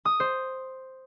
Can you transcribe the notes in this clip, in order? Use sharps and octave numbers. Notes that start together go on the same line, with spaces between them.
D#6
C5